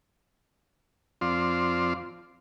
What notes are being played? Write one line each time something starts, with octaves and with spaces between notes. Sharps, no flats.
F2 C4 F4 D5 C6